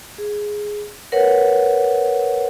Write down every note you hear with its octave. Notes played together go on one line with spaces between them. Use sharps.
G#4
A#4 B4 C#5 F#5